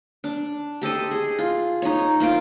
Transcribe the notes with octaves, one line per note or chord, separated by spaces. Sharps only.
D4
G4 A4 C5 D#5
G#4
F4
D#4 C#5
A#3 F4 C5 D6